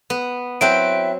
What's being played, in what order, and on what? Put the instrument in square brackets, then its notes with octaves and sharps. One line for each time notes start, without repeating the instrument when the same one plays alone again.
[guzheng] B3
[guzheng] F#3 C4 [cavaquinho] E4 B4 G5 [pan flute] E5 [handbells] D7